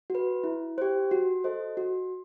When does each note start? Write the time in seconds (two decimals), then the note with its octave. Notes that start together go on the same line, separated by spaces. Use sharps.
0.10 F#4 B4
0.44 E4
0.78 G4 C5
1.11 F#4
1.44 A4 C5 D#5
1.77 F#4